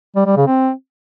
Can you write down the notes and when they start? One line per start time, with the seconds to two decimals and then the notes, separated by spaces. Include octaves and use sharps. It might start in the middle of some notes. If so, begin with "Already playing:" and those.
0.16 G3
0.26 G3
0.37 C#3
0.47 C4